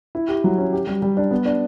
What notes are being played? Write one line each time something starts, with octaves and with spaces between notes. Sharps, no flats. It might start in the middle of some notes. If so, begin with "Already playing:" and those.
E4
G4
F#3
C#4
G4
G3
G3
D4
B3
D4